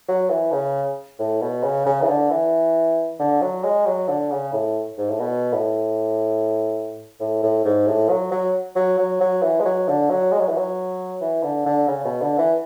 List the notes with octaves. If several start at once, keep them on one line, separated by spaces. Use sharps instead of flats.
F#3
E3
C#3
A2
B2
C#3
C#3
E3
D3
E3
D3
F#3
G#3
F#3
D3
C#3
A2
G#2
A2
B2
A2
A2
A2
G#2
A2
F#3
F#3
F#3
F#3
F#3
E3
G#3
F#3
D3
F#3
G#3
F#3
E3
F#3
E3
D3
D3
C#3
B2
D3
E3